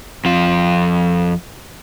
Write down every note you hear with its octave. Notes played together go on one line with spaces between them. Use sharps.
F2 F4